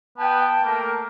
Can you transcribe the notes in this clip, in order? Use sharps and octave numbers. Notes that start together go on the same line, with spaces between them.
B3 G5 A5
A3 A#3 A#4